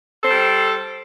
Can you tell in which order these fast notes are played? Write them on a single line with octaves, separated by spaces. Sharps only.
A4 C5 G3